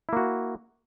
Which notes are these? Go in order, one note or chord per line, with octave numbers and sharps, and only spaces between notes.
A#3 E4 F#4